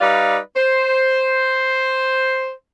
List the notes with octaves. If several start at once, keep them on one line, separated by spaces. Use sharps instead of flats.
G3 D#4 B4 D5 F5
C5